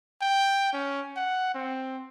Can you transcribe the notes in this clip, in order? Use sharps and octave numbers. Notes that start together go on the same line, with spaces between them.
G5
C#4
F#5
C4